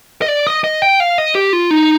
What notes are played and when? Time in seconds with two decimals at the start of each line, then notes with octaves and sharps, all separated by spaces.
0.22 D#5
0.28 D5
0.47 D#5
0.64 D#5
0.82 G5
1.00 F5
1.18 D#5
1.35 G4
1.53 F4
1.71 D#4